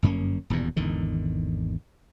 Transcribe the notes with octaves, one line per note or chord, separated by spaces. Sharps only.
G1 F#2 A#3 C#4
D#1 E2 G2 B2
G#1 E2 D3 D#3